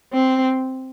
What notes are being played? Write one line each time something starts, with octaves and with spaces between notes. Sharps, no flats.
C4